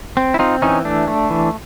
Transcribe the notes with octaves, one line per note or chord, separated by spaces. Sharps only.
C4
E4
C4 D#4 F4
E3 C#4 D#4
A3 D4
A3
E3